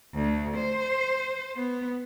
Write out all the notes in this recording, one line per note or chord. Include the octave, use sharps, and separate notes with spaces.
D2
C5
B3